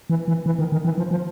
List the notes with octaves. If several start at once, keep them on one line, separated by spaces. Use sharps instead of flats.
E3
E3
E3
D#3
D#3
E3
F3
F3